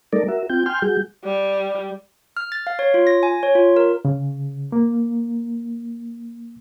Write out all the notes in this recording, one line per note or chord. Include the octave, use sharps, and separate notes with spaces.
G3 A3 D#4 A4 A#4 D5
F#4 A#4 E5
C4 F4 G5 G6
G5 G#5 C6 F6 G6
G3 F#4 G#4 G6
G3
F6
A6
F5
C#5
F4
A#6
G#5
C#5
F4
A#4
C#3
A#3